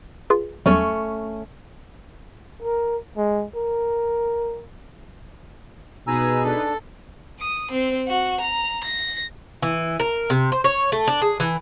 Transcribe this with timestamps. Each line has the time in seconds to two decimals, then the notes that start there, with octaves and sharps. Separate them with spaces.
0.30 F4 G#4 B4
0.66 E2 F#3 G3 A3 C#4 C#5
2.63 A#4
3.17 G#3
3.56 A#4
6.07 B2 D#4 G#4 B4 G#5 A#5 E6
6.44 D4 A4
7.39 D#6
7.71 C4
8.08 F#4
8.40 A#5
8.84 A#6
9.62 E3
10.00 A#4
10.30 C3
10.52 C5
10.64 C#5
10.92 A3
11.08 D4
11.21 G#4
11.40 E3